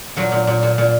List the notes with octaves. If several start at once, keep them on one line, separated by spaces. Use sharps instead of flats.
A#2 F#3
A#2
A#2
A#2
A#2